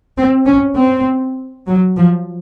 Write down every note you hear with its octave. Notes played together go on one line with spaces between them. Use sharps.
C4
C#4
C4
F#3
F3